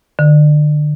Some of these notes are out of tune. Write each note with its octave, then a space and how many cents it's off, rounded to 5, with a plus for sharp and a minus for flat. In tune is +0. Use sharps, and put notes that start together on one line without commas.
D3 +30